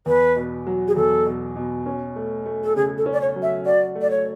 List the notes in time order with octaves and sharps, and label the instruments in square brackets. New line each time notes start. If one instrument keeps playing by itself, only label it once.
[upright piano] E2 [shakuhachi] B4
[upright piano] B2
F#3
[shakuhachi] G#4
[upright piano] E2 [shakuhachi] A4
[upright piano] B2
B2
C#4
A3
A3
[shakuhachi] A4
[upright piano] C#3 [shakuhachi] G#4
[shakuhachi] A4
[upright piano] C#4
[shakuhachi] D5
C#5
[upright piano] F#3
[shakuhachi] E5
[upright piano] F#4 [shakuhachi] D5
[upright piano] A3
[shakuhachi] D5
C#5